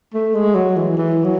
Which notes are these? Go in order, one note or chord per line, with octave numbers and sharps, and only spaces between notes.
A3
G#3
F#3
E3
E3
F#3